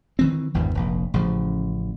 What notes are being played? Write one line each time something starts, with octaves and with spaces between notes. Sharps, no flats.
D#3 E3 C4
G#1 E2 G2 E3
F1 A#1
A1 C#3 F3